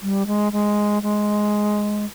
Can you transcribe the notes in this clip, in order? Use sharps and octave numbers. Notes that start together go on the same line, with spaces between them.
G3
G#3
G#3
G#3